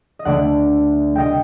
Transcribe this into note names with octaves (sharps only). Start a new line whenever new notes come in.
D#5
D2 D3 A3 D4 D5 F#5
C2 A#2 A3 D#5 G5